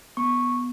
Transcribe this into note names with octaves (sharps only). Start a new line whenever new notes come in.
B3 C#6